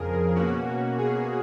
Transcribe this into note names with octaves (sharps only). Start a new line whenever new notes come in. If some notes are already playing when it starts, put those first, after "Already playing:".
Already playing: F2 C#3 F3 G#4 A#4
B2 A#3 C#4 F#4
G#4